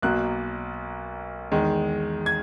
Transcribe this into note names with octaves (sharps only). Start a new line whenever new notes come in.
B1 B2 F#3 A#3 F#6
E2 D#3 G#3
G#6